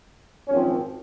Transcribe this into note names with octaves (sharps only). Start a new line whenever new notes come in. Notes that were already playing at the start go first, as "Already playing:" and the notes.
G#1 F#2 F3 C4 C#4